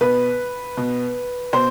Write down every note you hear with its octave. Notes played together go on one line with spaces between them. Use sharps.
B2 B4
B2
B2 C5